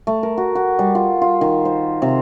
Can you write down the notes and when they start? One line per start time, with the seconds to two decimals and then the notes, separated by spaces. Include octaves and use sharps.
0.07 A3
0.23 A#4
0.37 F#4
0.55 F#4
0.79 G3
0.95 F4
1.22 F4
1.41 D#3
1.65 C5
2.02 C3